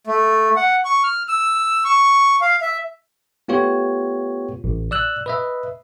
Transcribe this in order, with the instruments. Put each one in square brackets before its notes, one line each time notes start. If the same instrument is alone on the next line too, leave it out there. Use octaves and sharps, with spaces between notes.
[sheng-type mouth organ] A3
F#5
C#6
F6
E6
C#6
F5
E5
[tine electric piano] A3 B3 F4 G4 C#5
A1
D5 E6 F#6
B4 D#5 E5